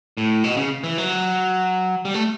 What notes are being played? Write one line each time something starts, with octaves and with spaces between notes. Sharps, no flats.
A2
B2
C#3
E3
F#3
G3
A3